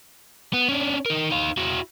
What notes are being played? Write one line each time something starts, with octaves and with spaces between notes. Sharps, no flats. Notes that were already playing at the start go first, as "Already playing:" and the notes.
B3
C#4 D4
D#4 A#4
D#4 F5
E4 F#4